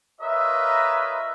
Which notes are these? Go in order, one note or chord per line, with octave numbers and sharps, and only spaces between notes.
F4 A#4 B4 C#5 D#5 E5